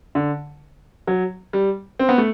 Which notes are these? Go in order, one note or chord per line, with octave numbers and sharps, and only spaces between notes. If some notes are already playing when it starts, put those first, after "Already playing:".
D3
F#3
G3
C4
B3
A3